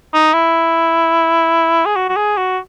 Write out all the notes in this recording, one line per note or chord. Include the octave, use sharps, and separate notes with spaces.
D#4
E4
G#4
F#4
F#4
G#4
F#4